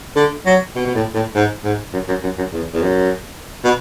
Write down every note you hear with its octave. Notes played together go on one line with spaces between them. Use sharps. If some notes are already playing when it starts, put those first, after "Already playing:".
D3
F#3
B2
B2
A2
A2
G#2
G#2
F#2
F#2
F#2
F#2
E2
E2
F#2
B2